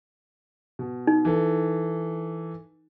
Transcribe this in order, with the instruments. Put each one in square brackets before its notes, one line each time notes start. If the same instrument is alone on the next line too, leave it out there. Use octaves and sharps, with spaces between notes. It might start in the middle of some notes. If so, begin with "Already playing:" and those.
[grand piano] B2
[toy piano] D#4
[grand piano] E3 A4